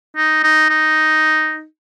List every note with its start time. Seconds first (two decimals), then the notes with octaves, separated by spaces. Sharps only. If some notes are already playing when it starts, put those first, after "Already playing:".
0.16 D#4
0.43 D#4
0.69 D#4